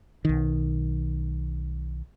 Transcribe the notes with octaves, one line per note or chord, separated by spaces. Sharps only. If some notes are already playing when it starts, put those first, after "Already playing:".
B1 D#3